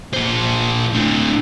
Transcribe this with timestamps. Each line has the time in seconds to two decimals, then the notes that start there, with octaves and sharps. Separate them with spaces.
0.13 A#2 C5
0.93 A2 D3